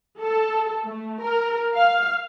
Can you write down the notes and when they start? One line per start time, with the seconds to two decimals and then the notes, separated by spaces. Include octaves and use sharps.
0.20 A4
0.84 A3
1.21 A#4
1.74 F5